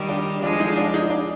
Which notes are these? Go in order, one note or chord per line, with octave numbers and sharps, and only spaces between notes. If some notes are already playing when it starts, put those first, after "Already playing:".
Already playing: D#3 G3
D4
F3 G#3 D4
D#4
D4
D#4
D4